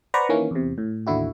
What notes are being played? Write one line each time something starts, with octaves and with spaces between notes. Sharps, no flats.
B4 C5 D5 F#5 A#5 C#6
D#3 E3 A#3 C#4
E2 C3
A2
A1 D#2 D3 E4 F#4